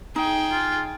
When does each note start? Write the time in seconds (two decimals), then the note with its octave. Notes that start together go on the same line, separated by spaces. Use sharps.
0.16 D#4 G#4 G5
0.52 F4